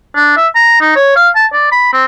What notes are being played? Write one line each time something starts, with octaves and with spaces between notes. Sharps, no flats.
D4
E5
A#5
D#4
C#5
F5
A5
D5
B5
C4